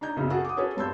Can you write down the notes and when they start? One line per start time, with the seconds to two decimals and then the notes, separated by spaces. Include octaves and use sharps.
0.01 D4 D#4 A#5 G6
0.16 B1 F#2 C#3
0.30 F#4 G#4 A4 F#5
0.45 D6 D#6
0.57 C#4 F#4 G#4 A4 B4 C#5
0.77 G2 A5 C6 E6 G6